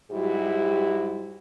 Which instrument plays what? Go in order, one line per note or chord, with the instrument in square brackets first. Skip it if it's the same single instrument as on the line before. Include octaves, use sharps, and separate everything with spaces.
[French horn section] G#2 F#3 G3 E4 F#4 G4